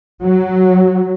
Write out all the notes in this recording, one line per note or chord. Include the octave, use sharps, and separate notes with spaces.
F#3